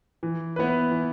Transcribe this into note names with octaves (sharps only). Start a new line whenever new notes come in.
E3
B3 E4 B4
E3